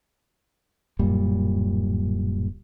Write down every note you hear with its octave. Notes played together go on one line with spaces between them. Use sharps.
D1 F#2 A#2 G3